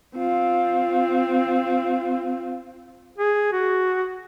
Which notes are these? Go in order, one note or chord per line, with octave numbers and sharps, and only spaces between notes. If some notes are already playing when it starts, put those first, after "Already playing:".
C4 F4
G#4
F#4